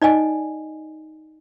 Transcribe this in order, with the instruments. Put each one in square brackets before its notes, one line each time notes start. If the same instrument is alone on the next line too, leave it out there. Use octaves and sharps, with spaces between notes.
[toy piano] D#4 D5 D#5 G#5